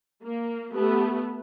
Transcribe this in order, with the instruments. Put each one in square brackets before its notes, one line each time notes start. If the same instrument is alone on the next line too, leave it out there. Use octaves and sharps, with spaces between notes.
[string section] A#3
[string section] A3 B3 [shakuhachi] G4